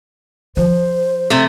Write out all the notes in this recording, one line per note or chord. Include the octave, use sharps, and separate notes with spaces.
F3 C5
C3 A3